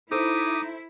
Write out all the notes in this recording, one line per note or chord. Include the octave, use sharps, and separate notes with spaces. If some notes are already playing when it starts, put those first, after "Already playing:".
D#4 E4 A4 C5 D6 D#6